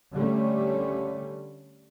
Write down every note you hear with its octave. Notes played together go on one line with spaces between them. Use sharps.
D3 G3 A3 C#4